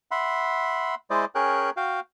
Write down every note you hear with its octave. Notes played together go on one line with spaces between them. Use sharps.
E5 F#5 B5 C6
G#3 E4 C5 D5 D#5
C#4 G#4 A#4 C#5 G5 F#6
F#4 F5 G5